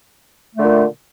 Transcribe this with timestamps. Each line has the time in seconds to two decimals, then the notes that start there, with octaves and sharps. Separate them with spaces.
0.56 A3
0.60 D3
0.64 A#2